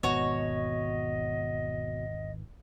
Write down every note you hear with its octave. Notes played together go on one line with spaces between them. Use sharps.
G#1 E2 B2 F#4 C#5 D#5